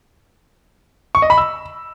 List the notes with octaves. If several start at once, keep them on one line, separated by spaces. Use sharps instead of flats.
C#6
D#5
B5
E6